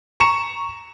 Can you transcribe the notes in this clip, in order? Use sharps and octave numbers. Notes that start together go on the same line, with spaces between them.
A#5 C#6 C#7 E7